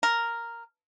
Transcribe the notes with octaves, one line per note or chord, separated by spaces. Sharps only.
A#4